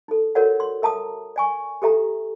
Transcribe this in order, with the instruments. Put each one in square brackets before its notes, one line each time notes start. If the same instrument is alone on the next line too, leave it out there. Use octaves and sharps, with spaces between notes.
[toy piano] D#4 A4
F#4 A4 A#4 C#5 D5 F#5
C6
A#4 E5 A5 A#5 D#6
D5 G#5 C#6
G4 A4 E5 A#5